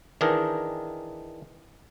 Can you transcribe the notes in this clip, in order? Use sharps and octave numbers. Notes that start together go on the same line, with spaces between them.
D#3 E3 D4 D#4 G#4 A#4